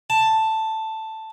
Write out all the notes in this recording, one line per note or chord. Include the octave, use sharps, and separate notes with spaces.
A5